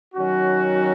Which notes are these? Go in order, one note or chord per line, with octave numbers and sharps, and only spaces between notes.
D#3 F#3 C#4 F#4